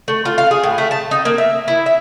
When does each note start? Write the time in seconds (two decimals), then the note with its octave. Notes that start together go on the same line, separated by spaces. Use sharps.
0.08 A3
0.25 F4
0.38 F5
0.51 G#4
0.63 A2
0.78 A3
0.91 A5
1.11 D#4
1.25 A#3
1.38 E5
1.68 E4
1.86 E5